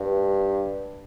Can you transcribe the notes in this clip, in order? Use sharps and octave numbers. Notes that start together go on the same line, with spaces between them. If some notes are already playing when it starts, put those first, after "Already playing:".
Already playing: G2